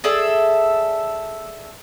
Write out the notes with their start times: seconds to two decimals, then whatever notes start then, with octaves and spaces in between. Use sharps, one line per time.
0.04 G#4 A4 D5 E5